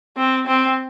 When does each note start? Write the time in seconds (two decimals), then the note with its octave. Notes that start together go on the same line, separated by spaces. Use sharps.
0.17 C4
0.47 C4